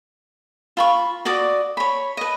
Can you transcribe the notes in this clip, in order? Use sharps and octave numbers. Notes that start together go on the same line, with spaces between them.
F4 B5 C#6
F#4 D5 D6 D#6
C#5 B5
B4 D#5